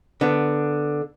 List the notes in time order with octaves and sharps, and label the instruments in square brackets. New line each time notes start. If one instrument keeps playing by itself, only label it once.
[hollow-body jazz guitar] D3 B3